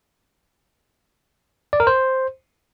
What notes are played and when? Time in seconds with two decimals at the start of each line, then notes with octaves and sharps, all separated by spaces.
1.73 D5
1.80 A#4
1.87 C5